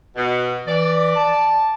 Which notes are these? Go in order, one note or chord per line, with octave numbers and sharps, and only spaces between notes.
B2
E3 D5
A5